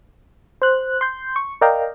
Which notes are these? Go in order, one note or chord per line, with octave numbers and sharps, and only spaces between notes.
C5 F#6
C6 G6
C#6
A#4 D5 D#5 F5 G5 A#5